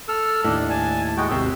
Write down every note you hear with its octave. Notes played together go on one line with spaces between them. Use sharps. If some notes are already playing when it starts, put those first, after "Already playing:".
A4 E6 F6
D#2 A2 D4
G#5 A5
G#3 F#4 G5
G#1 D#2 C3 E6